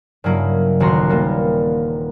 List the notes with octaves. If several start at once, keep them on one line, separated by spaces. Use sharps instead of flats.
G2 C#3 F#3 A#3 E4
D#1 A1 F#4 A#5 C6
G3 A#3 B3